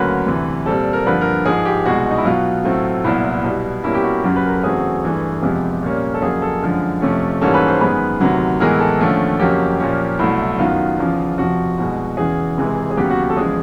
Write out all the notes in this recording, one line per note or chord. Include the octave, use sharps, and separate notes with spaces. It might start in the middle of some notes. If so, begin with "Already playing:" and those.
Already playing: D2 C#3 F#3 A#3 C#4 B4
D2 C3 E3
A#2 G3 C4 A4
A#4
G2 D3 F3 A#3 B4
A#4
G#2 F3 G#3 G#4
G4
C2 B2 G#3 F#4
D#4
E4
B2 F#3 B3 F4
A2 F#3 A3 C4
C2 A#2 F#3 B3 E4
B2 G3 B3
B2 G3 A#3 C#4 E4
G4
F#4
F#2 C#3 F#3 G4
B4
A#4
A4
E2 C#3 F#3 A3 C4 G#4
G2 E3 A3
F2 C3 F3 G#3 B3 G4
A#2 G3 A#3 C#4
A4
F2 C#3 F#3 A#3 G#4
A4
F#2 D3 F3 G#3
F2 C3 F3 A3 C#4
G#2 E3 G3 A#3 C#4 A4
B4
C5
F#2 D#3 G#3 B3 B4
D2 C3 D#3 F#3
A2 E3 G#3 B3 A#4
A4
D#2 D3 F3 A3 C#4
F2 C#3 F#3 A#3 C#4 G4
A#2 F3 A#3 C#4
C2 B2 F#3 A3 E4
F#2 D#3 F#3 B3 F4
E2 C#3 F3
F2 C3 F3 F#4
C2 B2 G#3
E2 C#3 E3 G#4
C#2 C3 E3 G#3
G#4
D#2 C#3 F#3 B3 G4
F#4
F#4
A4
E2 C#3 F3 G#3 G#4